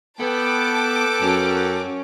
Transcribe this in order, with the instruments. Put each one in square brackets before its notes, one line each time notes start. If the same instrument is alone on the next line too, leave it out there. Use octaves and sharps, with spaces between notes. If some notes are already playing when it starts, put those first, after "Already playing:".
[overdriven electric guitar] B3 [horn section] A4 B4 G5 [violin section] A5 D6
[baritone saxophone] F#2 [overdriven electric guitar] C#4